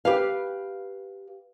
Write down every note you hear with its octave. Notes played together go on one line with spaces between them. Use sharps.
G4 B4 F5